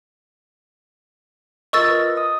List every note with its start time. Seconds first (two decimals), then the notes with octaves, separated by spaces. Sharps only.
1.73 F4 A#4 D#5 C#6 E6 A6
1.90 B4
2.17 D#5 D#6